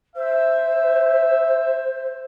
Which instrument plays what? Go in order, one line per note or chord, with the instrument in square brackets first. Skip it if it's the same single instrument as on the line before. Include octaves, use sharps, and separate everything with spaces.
[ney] C5 [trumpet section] E5